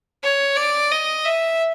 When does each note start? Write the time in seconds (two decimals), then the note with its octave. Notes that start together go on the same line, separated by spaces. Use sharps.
0.23 C#5
0.56 D5
0.92 D#5
1.26 E5